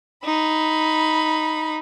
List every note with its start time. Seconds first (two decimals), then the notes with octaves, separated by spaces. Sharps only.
0.24 D#4 B5